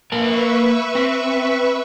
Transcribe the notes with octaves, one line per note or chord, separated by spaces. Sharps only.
A#3 A#4 B4 E5 A5 C#6
C4